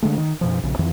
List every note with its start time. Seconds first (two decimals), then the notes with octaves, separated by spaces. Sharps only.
0.02 D3 G#3 A3
0.18 D#3
0.41 F#2 B2 F3
0.63 A#1 C#3
0.79 F2 D#3 E3 C4